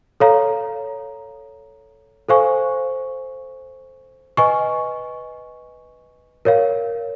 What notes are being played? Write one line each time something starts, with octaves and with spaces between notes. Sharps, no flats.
A4 C#5 F5 A#5
A4 C5 F5 G#5 C#6
B4 D#5 G#5 C#6
A#4 C#5 F5